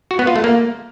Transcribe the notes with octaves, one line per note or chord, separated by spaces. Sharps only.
F#4
B3
F4
A3
A#3